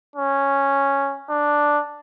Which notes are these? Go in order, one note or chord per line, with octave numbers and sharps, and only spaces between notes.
C#4
D4